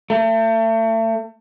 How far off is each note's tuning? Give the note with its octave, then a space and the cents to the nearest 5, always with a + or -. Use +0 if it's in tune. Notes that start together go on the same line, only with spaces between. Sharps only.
A3 +35